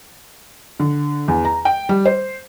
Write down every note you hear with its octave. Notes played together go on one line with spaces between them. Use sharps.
D3
E2
A#5
G5
G3
C5